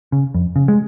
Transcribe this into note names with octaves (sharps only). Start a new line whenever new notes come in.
C#3
F2
C#3
G#3